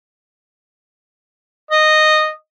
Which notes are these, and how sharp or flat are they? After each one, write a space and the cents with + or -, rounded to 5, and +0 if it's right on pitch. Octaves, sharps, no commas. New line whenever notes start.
D#5 -10